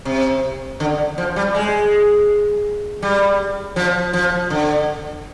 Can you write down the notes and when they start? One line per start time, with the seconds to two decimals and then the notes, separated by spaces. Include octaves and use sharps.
0.05 C3
0.80 D3
1.18 F3
1.36 G3
1.55 G#3
3.02 G3
3.76 F3
4.13 F3
4.50 D3